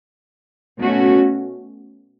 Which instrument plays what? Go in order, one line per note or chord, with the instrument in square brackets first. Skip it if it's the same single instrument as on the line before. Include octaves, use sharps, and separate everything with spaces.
[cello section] B2 A3 C#4 F#4